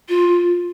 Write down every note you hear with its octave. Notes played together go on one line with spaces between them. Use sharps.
F4